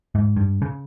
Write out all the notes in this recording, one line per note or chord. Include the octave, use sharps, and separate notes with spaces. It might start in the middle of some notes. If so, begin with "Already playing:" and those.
G#2
G2
C#3